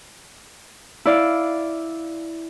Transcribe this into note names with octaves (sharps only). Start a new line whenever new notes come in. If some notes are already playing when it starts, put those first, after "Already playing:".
E4 D5 F5